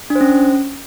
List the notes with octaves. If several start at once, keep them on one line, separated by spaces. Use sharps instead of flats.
D4
C5
C#4